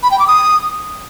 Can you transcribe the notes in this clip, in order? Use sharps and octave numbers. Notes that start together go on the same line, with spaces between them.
B5
G5
D6
D#6